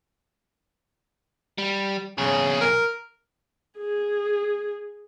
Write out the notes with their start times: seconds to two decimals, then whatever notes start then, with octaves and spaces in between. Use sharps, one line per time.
1.58 G3
2.18 B1 C#3 G#4
2.61 A#4
3.78 G#4